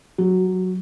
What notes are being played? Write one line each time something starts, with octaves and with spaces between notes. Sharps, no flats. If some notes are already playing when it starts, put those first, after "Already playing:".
F#3